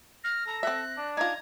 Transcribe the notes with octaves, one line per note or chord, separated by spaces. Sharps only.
F6 A#6
A4 A#5
C4 E5 F#6
D4
D#4 F4 A#5 G#6